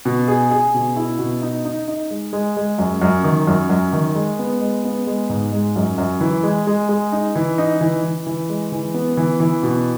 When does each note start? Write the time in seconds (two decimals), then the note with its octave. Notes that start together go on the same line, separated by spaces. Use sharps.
0.05 B2
0.28 G#4
0.51 G#4
0.74 B2
0.96 E4
1.19 B2
1.42 D#4
1.65 D#4
1.88 D#4
2.11 G#3
2.33 G#3
2.57 G#3
2.79 F#2
3.02 F#2
3.24 D#3
3.47 F#2
3.70 F#2
3.93 D#3
4.15 G#3
4.39 B3
4.61 G#3
4.85 B3
5.07 G#3
5.29 G#2
5.52 G#3
5.76 F#2
5.98 F#2
6.20 E3
6.43 G#3
6.67 G#3
6.89 G#3
7.12 D#4
7.36 E3
7.58 D#4
7.81 E3
8.03 E3
8.27 E3
8.49 G#3
8.72 E3
8.94 B3
9.17 E3
9.40 E3
9.63 B2